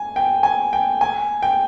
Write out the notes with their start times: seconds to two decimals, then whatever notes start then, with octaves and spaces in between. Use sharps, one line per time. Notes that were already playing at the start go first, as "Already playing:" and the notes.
Already playing: G#5
0.16 G5
0.43 G#5
0.73 G5
1.01 G#5
1.43 G5